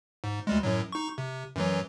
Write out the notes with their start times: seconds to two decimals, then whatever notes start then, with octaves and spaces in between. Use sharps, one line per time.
0.24 G#2
0.47 D2 G3 G#3
0.63 F#2 A2 F#3
0.92 D#4 C#6
1.18 C3
1.56 F#2 E3 F#3